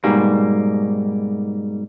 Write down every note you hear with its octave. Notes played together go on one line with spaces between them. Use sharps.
G#2 B2 G3 A#3